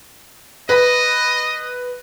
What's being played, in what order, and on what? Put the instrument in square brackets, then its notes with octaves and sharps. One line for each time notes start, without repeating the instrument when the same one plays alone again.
[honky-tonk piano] B4 B5 [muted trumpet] D#5